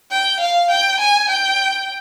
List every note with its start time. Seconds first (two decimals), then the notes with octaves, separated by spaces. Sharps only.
0.11 G5
0.40 F5
0.71 G5
1.00 G#5
1.29 G5